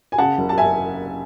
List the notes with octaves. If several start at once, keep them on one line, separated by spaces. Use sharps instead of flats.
G#5
C#3 F#5 A5
F#1
A5
E5 G#5